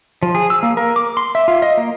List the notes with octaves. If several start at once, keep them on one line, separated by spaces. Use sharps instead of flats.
F3
G#4
E6
A#3
A#4
D6
C6
E5
F4
D#5
A#3